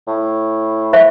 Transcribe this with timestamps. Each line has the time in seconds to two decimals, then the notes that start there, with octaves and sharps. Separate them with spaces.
0.07 A2
0.93 C5 E5